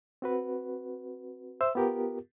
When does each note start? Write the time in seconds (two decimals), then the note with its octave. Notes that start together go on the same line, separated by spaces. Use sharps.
0.22 C4 F#4 B4
1.61 C5 E5 E6
1.75 B3 F4 G4 A#4